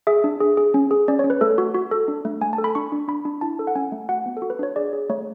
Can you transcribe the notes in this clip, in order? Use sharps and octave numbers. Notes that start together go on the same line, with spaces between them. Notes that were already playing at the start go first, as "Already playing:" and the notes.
G#4 E5
D4
G#4
G#4
C#4
G#4
C#4 D5
C#5
C#4
B4
A3 A4
F#4
F#4
A4
D4
A3
A3 G#5
A5
A4
B5
D4 C#6
D4
D4 B5
D4
E4 A5
A4
F#5
C#4 G#5
A3
F#4 F#5
B3
A4
F#4
B4
D4 C#5
G#4 D5
G#4
A3 C#5